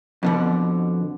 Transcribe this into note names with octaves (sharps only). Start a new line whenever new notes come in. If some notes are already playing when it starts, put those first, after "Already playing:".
F2 B2 D3